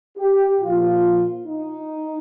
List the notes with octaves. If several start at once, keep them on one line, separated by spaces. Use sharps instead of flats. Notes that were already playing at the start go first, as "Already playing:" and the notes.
G4
A#2 F3 F4
D#4